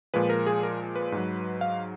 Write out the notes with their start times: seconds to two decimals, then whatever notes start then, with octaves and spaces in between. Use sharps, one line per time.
0.14 A#2 F3 G#3 B4
0.30 A#4
0.46 G#4
0.63 A#4
0.96 B4
1.12 G#2 F#3
1.61 F5